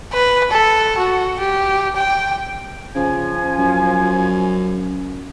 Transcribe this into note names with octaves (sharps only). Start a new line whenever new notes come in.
B4
A4
F#4
G4
G5
C#3 F3 G#5
F#2